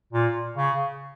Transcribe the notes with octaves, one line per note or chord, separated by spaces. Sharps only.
A#2
C#3